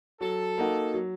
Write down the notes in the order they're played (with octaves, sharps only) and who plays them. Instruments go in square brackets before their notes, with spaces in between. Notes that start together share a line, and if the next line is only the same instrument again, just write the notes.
[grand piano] F#3 [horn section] A4
[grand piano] A#3 D#4 F#4
F#3